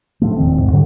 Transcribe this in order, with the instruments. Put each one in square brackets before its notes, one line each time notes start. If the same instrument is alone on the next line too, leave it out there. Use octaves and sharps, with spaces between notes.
[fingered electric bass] A2 F3 A3
E1 D#3 C4
C2 G#2
G#2 D3 F#3 G3